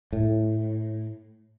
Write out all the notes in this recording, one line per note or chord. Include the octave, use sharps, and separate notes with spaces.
A2